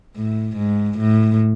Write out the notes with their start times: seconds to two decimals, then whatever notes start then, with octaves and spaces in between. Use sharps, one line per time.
0.16 A2
0.57 G#2
0.99 A2